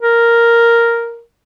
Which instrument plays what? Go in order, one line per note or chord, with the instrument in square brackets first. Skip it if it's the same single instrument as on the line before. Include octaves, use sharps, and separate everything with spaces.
[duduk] A#4